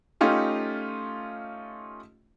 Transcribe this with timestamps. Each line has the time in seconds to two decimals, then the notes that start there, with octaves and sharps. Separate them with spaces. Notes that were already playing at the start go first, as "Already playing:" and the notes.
0.21 A3 C#4 D#4 F4 G4